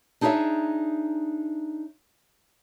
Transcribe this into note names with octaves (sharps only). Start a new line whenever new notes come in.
D4 D#4 G#4 B4 C#5 E5